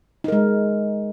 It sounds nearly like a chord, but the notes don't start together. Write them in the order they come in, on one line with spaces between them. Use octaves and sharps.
D#4 A#4 G#3